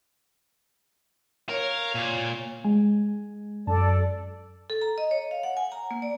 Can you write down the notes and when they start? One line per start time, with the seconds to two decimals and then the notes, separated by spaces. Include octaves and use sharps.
1.49 A#4 C#5 F5
1.95 A#2
2.64 G#3 G#5
3.67 F#2 A4 D5 A5
4.70 A4
4.82 A#5
4.98 D#5
5.11 C#5
5.31 F5
5.43 F#5
5.57 G#5
5.72 A#5
5.91 A#3
6.02 D5